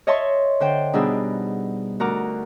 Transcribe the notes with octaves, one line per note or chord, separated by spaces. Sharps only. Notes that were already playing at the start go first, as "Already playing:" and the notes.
C#5 D#5 E5 A5 C6 C#6
D3 C5 G5
B2 G3 D4 D#4 G#4 E6
D2 F#4 A#4 A#5 D6